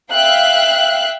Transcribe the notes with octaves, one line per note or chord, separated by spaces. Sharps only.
E5 F5 G5 F#6